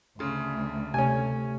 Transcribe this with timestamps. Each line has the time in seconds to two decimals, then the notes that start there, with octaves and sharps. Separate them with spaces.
0.19 D2 C#3 C6
0.94 C3 A3 C#4 G#5